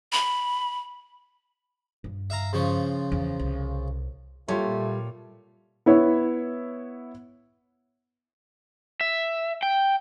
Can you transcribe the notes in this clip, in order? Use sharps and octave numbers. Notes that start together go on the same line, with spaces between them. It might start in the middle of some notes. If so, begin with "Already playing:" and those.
B5
G2
E5 F5 A#5
C#3 F3 C#4
E2
C2
A#2 G3 A3 F4 G4 C#5
B3 E4 C#5
E5
G5